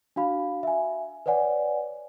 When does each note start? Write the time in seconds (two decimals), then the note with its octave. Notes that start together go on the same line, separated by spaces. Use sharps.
0.16 D4 F#4 F5 B5
0.63 E5 G#5
1.26 B4 C#5 D5 F#5 G#5